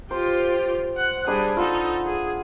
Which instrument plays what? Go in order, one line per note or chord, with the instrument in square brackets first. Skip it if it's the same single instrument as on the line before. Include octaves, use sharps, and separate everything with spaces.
[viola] F4 G4 [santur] C5
[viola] F#5
[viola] G3 G#4 [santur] D4 B5
[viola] D#4 A4 [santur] F4 F#5
[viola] G#4